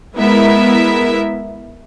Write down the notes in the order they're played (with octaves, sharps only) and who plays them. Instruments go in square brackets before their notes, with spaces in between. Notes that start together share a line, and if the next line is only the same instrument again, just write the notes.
[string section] G#3 B3 E4 A#4 E5